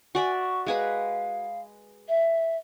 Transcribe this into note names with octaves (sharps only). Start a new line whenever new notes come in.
F#4 D5 E5 G#5
C#6
G#3 G#4 B4 F5
E5